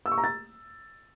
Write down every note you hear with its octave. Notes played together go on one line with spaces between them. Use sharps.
E6
C#6
A#5
A6